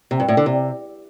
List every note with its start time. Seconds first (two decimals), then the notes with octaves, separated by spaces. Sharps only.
0.11 C3
0.20 G2
0.28 A2
0.37 D3
0.46 C3